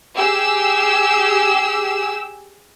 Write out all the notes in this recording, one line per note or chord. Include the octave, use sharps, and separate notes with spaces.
G4 G#4 E6